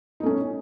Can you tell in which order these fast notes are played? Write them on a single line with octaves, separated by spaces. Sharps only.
D#4 A3 C#4